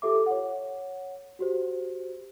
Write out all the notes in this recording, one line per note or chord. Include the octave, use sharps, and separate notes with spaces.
F4 G4 A4 E5 D6
C#5 F#5
F#4 G4 C5